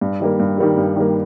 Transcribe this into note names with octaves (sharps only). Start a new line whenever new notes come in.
G2
D#3 G3 A#3
G2
D#3 G3 A#3
G2
D#3 G3 A#3